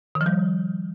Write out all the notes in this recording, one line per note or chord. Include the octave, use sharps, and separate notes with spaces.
D#3
F3
G3